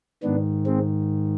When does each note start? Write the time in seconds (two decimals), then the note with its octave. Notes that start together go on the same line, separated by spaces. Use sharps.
0.23 G#2 D#3 B3 D4
0.66 G#3 C4